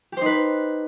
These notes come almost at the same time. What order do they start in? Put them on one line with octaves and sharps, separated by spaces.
G4 C5 D#4 B4